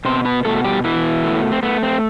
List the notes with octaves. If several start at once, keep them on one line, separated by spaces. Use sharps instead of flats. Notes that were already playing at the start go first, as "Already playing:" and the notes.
B2 C4 C5
B3 B4
B2 A3 A4
A4
G3 G4
B2 E3 E4
A3
C4
A3 B3
C4